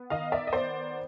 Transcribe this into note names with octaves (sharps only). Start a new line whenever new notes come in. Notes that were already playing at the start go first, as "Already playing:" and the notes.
Already playing: B3
D#3 D#5 F5
D5 E5
D#5
B3 C5 D5